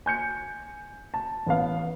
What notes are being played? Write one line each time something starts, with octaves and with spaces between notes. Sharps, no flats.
G#5 G6 C#7
A5
A1 B3 F5